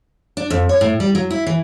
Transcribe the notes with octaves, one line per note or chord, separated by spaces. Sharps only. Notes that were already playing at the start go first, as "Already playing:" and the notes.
D4
F2
C#5
A2
G3
F#3
E4
E3